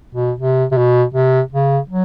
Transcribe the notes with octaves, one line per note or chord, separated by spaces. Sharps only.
B2
C3
C3
B2
C3
C#3
F#3